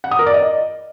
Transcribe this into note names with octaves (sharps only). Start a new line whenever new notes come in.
F#5
D#6
A#4
D5
D#5